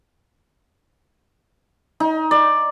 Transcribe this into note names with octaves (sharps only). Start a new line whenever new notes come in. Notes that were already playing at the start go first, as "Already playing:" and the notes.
D#4
D5